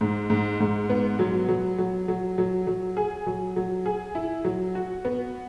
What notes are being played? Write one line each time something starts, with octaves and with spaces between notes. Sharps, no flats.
G#2
G#2
G#2
B3
F#3
F#3
F#3
F#3
F#3
F#3
G#4
F#3
F#3
G#4
E4
F#3
F#4
B3